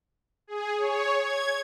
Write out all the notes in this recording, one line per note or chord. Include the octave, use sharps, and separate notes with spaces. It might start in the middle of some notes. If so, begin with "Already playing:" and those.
G#4
C#5
G#6